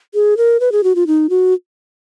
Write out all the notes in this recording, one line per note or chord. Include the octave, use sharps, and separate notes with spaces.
G#4
A#4
B4
G#4
F#4
F4
D#4
F#4